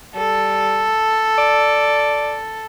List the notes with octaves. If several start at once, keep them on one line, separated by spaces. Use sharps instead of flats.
G3 A4
D5